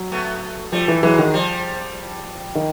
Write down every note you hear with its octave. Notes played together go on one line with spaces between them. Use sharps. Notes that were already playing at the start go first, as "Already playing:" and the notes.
Already playing: F#3
A3 B3
F3 G3 A3
E3
E3 F#3 G#3
D#3
F3 G3
D#3